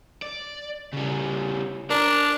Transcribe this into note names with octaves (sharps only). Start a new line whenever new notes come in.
D5
C#3 G3
D4 A#4 A#5